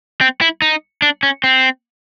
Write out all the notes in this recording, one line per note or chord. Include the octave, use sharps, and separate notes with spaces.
C4
E4
D#4
D4
C#4
C4